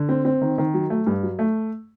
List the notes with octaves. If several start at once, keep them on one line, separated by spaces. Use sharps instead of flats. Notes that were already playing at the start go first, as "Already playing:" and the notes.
Already playing: D3
C4
C4
D#3
D#3
F#3
A3
G2
F#3
A3